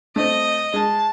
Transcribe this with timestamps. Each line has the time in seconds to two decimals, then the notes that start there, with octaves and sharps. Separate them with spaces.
0.16 A3 C4 D#5
0.74 G#3 A5